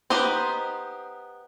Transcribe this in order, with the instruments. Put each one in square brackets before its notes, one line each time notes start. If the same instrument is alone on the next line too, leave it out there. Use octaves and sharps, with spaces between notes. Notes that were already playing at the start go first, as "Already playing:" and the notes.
[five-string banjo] B3 D#4 G4 C5